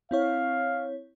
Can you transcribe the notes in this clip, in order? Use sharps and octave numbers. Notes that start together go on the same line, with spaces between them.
C4 E4 C#5 F5